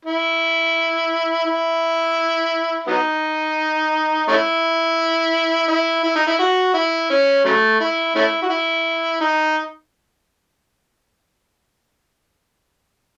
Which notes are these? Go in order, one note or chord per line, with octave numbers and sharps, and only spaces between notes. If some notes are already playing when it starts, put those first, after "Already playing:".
E4
E4
F#3 B3 D#4
A3 C#4 E4
E4
E4
D#4
E4
F#4
E4
C#4
C#3 F#3 A3
E4
A3 C#4 E4
F#4
E4
D#4